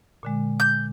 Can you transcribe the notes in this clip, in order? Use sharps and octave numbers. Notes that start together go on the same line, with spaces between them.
A#2 D3 G#3
G6